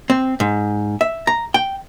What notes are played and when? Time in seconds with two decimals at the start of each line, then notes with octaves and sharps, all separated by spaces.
0.10 C4
0.40 G#2
1.01 E5
1.27 A#5
1.54 G5